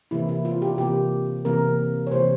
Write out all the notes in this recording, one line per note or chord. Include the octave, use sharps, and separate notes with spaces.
C3 E3 A#3 E4
E4
F4
G4
C3 E3 A#3 G4
C3 E3 A#3 A#4
C#5
C3 E3 A#3 C5